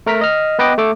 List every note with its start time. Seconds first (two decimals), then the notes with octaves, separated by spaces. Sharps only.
0.06 A3 A#4 A#5 B6
0.21 D#5 F6
0.59 B3 B4 D#5 G5 D6
0.78 A3 A4 D6